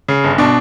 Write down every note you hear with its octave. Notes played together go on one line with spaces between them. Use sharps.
C#3
G1
B2 D4